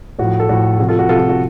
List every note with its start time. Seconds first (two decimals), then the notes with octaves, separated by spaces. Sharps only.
0.19 A2 F3 F#4
0.40 A4
0.49 A2 F3 F#4
0.79 C3 F3 F#4
0.89 F4 A4
0.99 F#4
1.09 C3 F3 F4 A4
1.20 F4
1.29 F#4